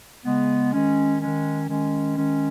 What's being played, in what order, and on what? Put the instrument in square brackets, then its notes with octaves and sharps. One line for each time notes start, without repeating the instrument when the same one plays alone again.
[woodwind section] C#3 G#3 B3
D#3 G#3 C#4
D#3 G#3 C#4
D#3 G#3 C#4
D#3 G#3 C#4